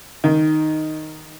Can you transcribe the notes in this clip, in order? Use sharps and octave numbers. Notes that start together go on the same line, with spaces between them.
D#3